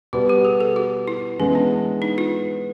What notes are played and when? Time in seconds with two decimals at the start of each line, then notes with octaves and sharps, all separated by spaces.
0.13 B2 G3 B3 F#4
0.29 G4
0.45 G#4
0.60 A4
0.76 F#4
1.08 E4
1.39 E3 G#3 B3 C#4
1.55 D4
2.02 D#4
2.18 F4